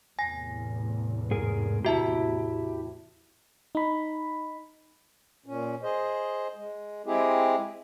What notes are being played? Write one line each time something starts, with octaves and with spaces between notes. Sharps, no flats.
E2 A2 C3 G#5 A#6
G#2 G#4 A#4
E4 F#4 G4 E5 A5
D#4 B5
A#2 C#4
G#4 C5 D#5
G#3
G#3 C4 E4 G4 G#4